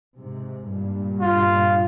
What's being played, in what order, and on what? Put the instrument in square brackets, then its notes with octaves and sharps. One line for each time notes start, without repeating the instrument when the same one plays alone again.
[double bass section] G#2 C3
G2 A#2
[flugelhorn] F4